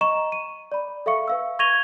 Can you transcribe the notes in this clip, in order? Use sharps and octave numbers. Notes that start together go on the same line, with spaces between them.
D#5 A#5 C#6 E7
D#7
D5 B5
A4 E5 F5 C#6 C#7
B4 F5 E6
C#6 G#6 A#6 D#7 F7 G7